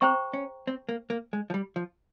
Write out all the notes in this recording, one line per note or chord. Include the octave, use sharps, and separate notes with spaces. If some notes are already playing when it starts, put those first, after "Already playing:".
C4 G#4 C5 G5 A#5 C#6
C#4
C4
A#3
A#3
G#3
F3
G3
F3